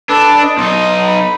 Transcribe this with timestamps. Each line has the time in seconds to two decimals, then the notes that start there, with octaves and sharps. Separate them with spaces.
0.09 D4 A4 B4 A5
0.42 D#5
0.58 B1 D#4 D#5 C6
1.07 B5